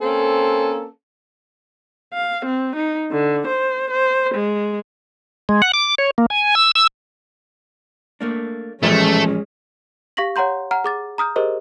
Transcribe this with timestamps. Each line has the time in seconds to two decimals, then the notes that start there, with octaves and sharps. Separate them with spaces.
0.01 A#3 C4 C#4 A4
2.13 F5
2.46 C4
2.76 D#4
3.12 D3
3.48 C5
3.91 C5
4.35 G#3
5.49 G#3
5.62 F#5
5.74 D6
5.98 C#5
6.18 A#3
6.30 G#5
6.55 E6
6.75 E6
8.21 A3 A#3 D4
8.83 A1 A#2 F3 G#3 A3 C#4
10.17 G4 F5 C#6 A#6 B6 F#7
10.36 C#5 F#5 A#5 C6 G6
10.71 F#5 A#5 F6
10.84 G#4 D6 A6
11.18 A#5 D#6 F6 G6
11.36 G4 G#4 A#4 C5 D#5